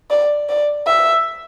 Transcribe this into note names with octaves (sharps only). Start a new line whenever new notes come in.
D5
D5
E5